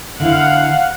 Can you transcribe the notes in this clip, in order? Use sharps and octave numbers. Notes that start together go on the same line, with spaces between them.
D3 E4 F5 F#5